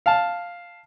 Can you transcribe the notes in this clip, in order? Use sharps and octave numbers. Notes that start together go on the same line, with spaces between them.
F5 A5